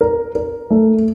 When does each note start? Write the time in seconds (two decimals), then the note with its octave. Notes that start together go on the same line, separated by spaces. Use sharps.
0.01 A#4
0.35 A#4
0.70 A3